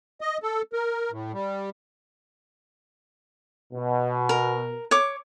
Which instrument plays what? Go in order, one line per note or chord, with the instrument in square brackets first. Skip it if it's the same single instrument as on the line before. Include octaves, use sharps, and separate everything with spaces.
[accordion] D#5
A4
A#4
A2
G3
[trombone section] B2
[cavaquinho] A#4
C#5 D6